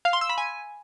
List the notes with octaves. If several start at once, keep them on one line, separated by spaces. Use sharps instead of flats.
F5
C6
E6
B5
G#5